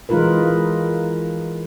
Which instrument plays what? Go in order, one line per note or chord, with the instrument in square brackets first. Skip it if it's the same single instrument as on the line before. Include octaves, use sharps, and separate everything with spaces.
[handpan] E3 G#3 D#4 F4 A#4 B4